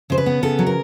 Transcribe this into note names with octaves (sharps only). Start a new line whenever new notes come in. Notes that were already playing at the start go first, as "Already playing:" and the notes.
C#3 C5
B4
B3
C#3 A4
F#3
A#4